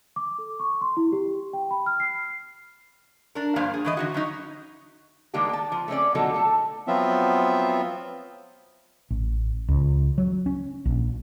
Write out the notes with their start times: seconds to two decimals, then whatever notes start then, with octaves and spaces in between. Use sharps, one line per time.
0.16 D6
0.38 A4
0.60 C#6
0.81 C6
0.97 E4
1.12 G4
1.53 G5
1.71 B5
1.86 F6
2.00 C7
3.35 D4 A#4
3.56 G2 F3 A#3 C5 F5
3.74 G#4
3.85 A2 E3 D#5
3.97 D3 D#4 F#4
4.14 F#3 C#4 D#4
5.34 D#3 G3 G#3 A#3 D4 G4
5.49 G5 A5
5.72 F3
5.88 A3 C4 C#4 D5
6.15 B2 D3 F3 F#3 D#4 A4
6.34 A3 A4
6.87 F3 F#3 B3 C4 F4 E5
9.10 A1
9.69 C#2
10.18 F#3
10.46 C#4
10.85 A#1